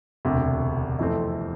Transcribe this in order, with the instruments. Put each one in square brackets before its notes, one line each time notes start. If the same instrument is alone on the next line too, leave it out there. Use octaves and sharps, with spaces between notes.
[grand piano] E1 D2 C3
F2 C3 E3 A3 C4